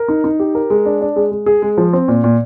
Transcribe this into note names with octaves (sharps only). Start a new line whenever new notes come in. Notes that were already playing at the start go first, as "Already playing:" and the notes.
Already playing: A#4
D#4
D#4
G4
A#4
G#3
D4
D4
G#3
G#3
G#4
G#3
F3
C4
A#2
A#2